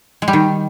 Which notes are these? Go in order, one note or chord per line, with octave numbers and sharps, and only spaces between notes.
G#3
G3
D#3